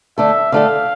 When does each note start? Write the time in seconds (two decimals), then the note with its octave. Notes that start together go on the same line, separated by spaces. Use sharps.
0.18 D3 A3 D4 A4 E5
0.52 D3 A3 D4 A4 F5